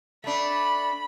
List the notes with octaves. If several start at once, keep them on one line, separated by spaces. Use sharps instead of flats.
A3 D4 B5